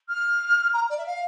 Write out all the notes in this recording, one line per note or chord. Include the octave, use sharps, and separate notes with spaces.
F6
A#5
D5
E5
F5